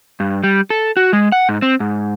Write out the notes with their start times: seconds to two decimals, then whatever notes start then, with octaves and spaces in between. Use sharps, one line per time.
0.20 G2
0.43 G3
0.70 A4
0.97 F#4
1.13 G#3
1.32 F#5
1.49 G#2
1.62 C4
1.80 G#2